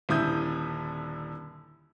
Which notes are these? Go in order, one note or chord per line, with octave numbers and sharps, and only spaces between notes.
D#1 D3 E4 D#6 G6